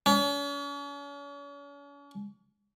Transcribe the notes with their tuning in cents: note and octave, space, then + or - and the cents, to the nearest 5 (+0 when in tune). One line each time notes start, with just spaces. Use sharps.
C#4 +40